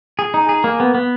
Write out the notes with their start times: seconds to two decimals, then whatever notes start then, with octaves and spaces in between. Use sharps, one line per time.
0.19 G#4
0.34 D#4
0.49 G#4
0.64 A#3
0.80 B3
0.95 B3